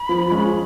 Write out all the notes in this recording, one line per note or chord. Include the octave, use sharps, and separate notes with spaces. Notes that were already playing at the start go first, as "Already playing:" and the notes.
Already playing: B5
F3
G#3 C#4 F4